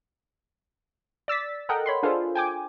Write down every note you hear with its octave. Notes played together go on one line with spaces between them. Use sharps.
D5 E6 A6 B6
A4 A#4 D#5 F#5 G5
C#5 B5 C6
D4 F4 G#4 A4 C5
G5 G#5 D6